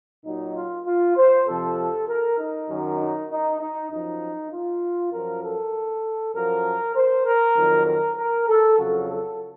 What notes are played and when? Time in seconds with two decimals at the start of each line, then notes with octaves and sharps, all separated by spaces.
0.25 A#2 F#3 D#4
0.56 F4
0.86 F4
1.17 C5
1.47 F2 C3 F3 A4
2.08 A#4
2.38 D#4
2.69 F#2 D#3 F#3
2.99 D#4
3.30 D#4
3.60 D#4
3.91 F#2 F3 D#4
4.52 F4
5.13 F#2 F3 A#4
5.43 A4
6.35 F#2 F3 A#4
6.96 C5
7.26 A#4
7.57 F2 D#3 F#3
7.87 A#4
8.17 A#4
8.48 A4
8.78 F2 C#3 F#3 F#4
9.09 A4